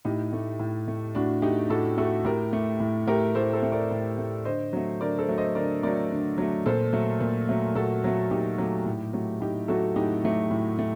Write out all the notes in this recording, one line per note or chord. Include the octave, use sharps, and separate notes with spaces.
A2 D#4 G4
A3
A2
A3
A2 D4 F#4
A3 D#4 G4
A2 F#4 A4
A3 F#4 A4
A2 G4 A#4
A3
A2
A3 G4 A#4
A2 A4 C5
A4 C5
A3
A#4 D5
A2
A3
D3 C5 D#5
F#3 A3
D3 A#4 D5
A4 C5
F#3 A3
C5 D#5
D3 A#4 D5
F#3 A3 A#4 D5
D3
F#3 A3
A#2 A4 C5
F#3 A3
A#2
F#3 A3
A#2 F#4 A4
F#3 A3
A#2 D#4 G4
F#3 A3
A2
F#3 A3
A2 D#4 G4
F#3 A3 F#4 A4
A2 D#4 G4
F#3 A3
A2
A3